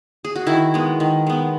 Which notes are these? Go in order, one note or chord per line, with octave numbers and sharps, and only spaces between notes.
G#4
F#4
D#3 E4
G#3 B3
D#3
G#3 B3